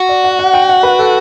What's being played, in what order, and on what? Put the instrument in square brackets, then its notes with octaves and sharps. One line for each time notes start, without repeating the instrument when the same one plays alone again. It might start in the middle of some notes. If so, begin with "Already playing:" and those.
Already playing: [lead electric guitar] F#4
[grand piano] D5
F#5
F#5
G5
F#5
B4
A4